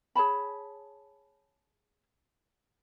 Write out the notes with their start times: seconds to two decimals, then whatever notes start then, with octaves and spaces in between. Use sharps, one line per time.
0.15 G#4 C#5 A5 B5